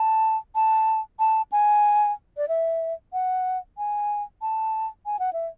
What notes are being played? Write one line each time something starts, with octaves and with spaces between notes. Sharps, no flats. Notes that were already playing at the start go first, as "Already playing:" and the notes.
Already playing: A5
A5
A5
G#5
D5
E5
F#5
G#5
A5
G#5
F#5
E5